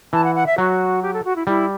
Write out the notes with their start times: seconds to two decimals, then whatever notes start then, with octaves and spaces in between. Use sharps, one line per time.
0.13 E3 A5
0.24 F#5
0.35 F#5
0.46 E5
0.58 F#3 F#4
1.03 G4
1.14 A4
1.24 F#4
1.36 E4
1.47 G3 E4